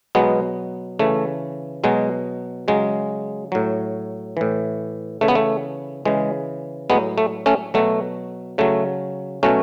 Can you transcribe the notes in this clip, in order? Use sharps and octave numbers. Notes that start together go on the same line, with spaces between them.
B2 F#3 G#3 B3
C#3 E3 A3
B2 F#3 G#3
C#3 F#3 G#3
A2 F#3
A2 E3
C#3 E3 A3
B3
A3
C#3 E3 G#3
A2 F#3 G#3 B3
A3
A3 C#4
B2 F#3 A3
C#3 F#3 A3
B2 F#3 A3 C#4